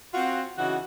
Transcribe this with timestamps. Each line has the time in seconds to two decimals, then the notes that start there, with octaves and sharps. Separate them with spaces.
0.14 C4 F4 F#4
0.58 C#3 E3 D#4 F#4